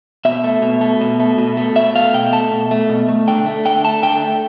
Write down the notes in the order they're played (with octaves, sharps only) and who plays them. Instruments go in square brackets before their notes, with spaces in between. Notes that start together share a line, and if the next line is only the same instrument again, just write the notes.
[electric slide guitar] B2 E5
A3
B2
A3
B2
A3
B2
A3
B2 E5
A3 F5
B2 G5
A3 A5
B2
A3
B2
A3
D3 G5
A3
D3 G5
A3 A5
D3 G5
A3